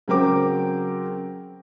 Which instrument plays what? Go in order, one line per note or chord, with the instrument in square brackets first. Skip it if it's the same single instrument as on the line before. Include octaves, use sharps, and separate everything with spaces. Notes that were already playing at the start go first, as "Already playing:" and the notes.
[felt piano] C#3 F#3 C4 A#4 G5 D6